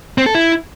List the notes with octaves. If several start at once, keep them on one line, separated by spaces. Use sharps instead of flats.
C4
A4
E4